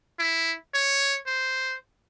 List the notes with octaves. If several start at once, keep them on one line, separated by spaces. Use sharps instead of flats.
E4
C#5
C5